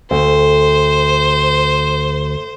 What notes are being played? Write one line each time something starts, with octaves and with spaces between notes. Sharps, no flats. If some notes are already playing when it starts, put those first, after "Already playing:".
D2 C5